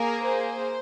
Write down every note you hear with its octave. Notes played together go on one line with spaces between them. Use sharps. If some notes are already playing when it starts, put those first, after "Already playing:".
Already playing: A#3 G#4 A#4
C5